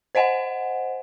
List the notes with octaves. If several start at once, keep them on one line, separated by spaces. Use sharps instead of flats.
C5 D#5 F#5 G#5